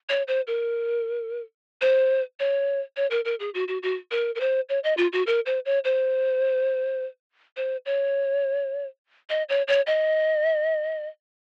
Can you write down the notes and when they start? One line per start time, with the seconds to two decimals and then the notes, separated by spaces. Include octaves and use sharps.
0.09 C#5
0.28 C5
0.47 A#4
1.81 C5
2.40 C#5
2.97 C#5
3.11 A#4
3.25 A#4
3.40 G#4
3.54 F#4
3.68 F#4
3.83 F#4
4.11 A#4
4.35 A#4
4.40 C5
4.69 C#5
4.84 D#5
4.97 F4
5.13 F#4
5.27 A#4
5.46 C5
5.66 C#5
5.84 C5
7.57 C5
7.86 C#5
9.30 D#5
9.49 C#5
9.68 C#5
9.87 D#5